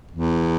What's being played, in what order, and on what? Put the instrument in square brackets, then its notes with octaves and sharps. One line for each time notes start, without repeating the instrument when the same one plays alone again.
[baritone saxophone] E2